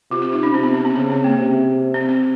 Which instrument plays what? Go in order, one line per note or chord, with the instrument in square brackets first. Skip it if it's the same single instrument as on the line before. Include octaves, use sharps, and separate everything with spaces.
[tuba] C3 [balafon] F4
[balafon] F4
D#4
C#4
[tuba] C3 [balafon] C4
[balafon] B3
C4
B3
[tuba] C#3 [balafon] B3
[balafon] C4
A#3
[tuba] C3
[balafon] C4
C4